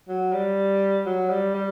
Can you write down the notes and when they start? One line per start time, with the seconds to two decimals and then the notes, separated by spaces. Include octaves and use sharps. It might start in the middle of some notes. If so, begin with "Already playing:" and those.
0.09 F#3
0.33 G3
1.06 F#3
1.30 G3
1.55 G3